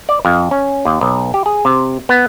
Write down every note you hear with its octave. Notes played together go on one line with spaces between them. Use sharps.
D5
F2
C#4
D#2
B1
G4
G#4
C3
B3